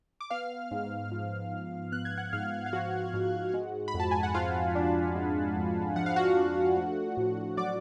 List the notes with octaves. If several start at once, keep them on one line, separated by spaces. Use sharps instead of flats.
D6
B3 F5 F6
G#2
F3
G#2
B3 F#6
G#6
F#5 F#6
G#2 F5 F6
F5
F3 F#4 F#5
G#2
G#3
B5
F2
A5
G#5
F#5
F3 F4 F5
D4
G#3
F2
F3 F#5
F5
F#4 F#5
D4
A3
A2
F#3 D5 D6